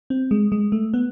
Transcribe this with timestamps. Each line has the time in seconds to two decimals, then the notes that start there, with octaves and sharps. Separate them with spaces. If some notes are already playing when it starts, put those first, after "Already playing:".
0.10 C4
0.31 G#3
0.52 G#3
0.72 A3
0.94 B3